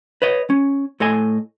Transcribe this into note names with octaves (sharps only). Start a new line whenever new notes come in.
B4 C#5 D#5
C#4
A2 A4 D#5 G#5